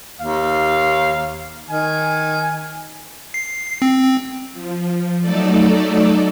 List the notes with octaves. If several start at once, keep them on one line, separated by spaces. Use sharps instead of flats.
D#2 F5
D#3 G#5
C7
C4
C4
F3
F#3 A3 D#4 A4 D5